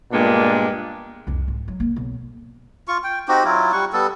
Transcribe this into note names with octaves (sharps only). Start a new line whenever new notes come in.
G2 A#2 G#3 A#3 B3 D4
C2 F2
G#2
F#3
C2 A#3
B1
F4 C#6
G5
C4 D#4 F#4 G4
F#3 E4 F4
G3 F#5 C#6
G3 B3 A4